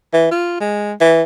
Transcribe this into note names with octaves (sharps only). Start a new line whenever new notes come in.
E3
F4
G#3
E3